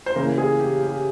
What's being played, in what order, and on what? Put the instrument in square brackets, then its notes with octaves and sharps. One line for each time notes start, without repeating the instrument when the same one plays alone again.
[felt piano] C5
C#3 E3 A#3 A#4
G#4
G4
G4